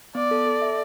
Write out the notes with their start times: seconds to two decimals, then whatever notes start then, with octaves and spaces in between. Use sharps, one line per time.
0.15 B3 D5
0.31 A4
0.47 A4
0.62 E5